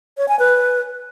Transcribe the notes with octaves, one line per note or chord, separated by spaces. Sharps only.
C#5
G#5
B4